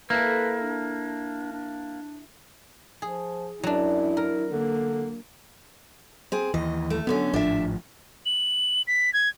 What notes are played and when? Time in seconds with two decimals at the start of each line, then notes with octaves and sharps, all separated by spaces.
0.10 A#3 E4 A4 B4
0.62 D4
1.52 D4
3.02 F3 G#4
3.63 F#2 F#3 D4 E4
4.17 A#4
4.51 D3 A#3
6.32 C4 G#4
6.54 D#2 E3 D#5
6.90 A3
7.07 F#2 D3 B3 C#4
7.34 G#1 A2 F3 D4 E5
8.26 F#7
8.87 B6
9.14 G#6